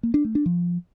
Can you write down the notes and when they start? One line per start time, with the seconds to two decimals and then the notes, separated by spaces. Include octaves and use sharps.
0.03 A#3
0.14 D4
0.25 A3
0.35 D4
0.46 F3